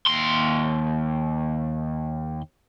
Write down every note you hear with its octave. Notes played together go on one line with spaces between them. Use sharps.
D#2 C6